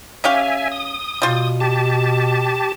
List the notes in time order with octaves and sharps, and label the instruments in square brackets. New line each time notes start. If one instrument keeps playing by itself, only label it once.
[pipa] C#4 G4 F5 [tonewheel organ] E5 G#5
[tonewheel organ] D#6
[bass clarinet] B2 [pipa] G3 F4
[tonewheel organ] G4 A5